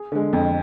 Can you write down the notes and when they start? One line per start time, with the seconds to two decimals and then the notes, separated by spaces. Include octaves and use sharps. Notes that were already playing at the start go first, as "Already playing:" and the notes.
Already playing: G#4
0.12 D3 G#3
0.33 F2